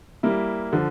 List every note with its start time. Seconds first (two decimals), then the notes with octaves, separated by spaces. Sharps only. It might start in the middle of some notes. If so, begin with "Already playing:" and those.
0.23 G3 A#3 E4
0.73 D3 F3